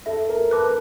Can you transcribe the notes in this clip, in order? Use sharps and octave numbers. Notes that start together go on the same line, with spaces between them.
A4 E5
A#4
B4 A5 D6 F#6